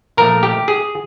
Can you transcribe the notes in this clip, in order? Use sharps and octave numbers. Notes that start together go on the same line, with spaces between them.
A#2 F3 A3 A#4
G4
G#4